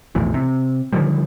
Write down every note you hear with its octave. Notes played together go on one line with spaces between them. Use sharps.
B1 F2 A2 E3
C3
D3 D#3 F3 G3